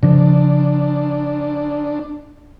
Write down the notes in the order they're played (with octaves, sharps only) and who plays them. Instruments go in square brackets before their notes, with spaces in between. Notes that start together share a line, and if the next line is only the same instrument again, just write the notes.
[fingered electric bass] C#3 F3 [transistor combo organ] D4